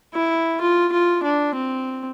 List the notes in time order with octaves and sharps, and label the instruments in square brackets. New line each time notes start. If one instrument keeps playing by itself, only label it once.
[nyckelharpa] E4
F4
F4
D4
C4